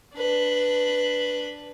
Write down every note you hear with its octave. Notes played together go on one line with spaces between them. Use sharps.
D4 B4